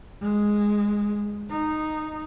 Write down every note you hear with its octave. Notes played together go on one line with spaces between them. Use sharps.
G#3
D#4